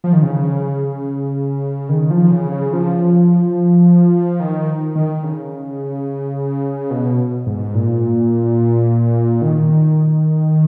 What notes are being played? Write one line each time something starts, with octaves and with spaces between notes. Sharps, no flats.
F3
D#3
C#3
D#3
F3
C#3
C#3
F3
D#3
D#3
C#3
B2
G#2
A#2
D#3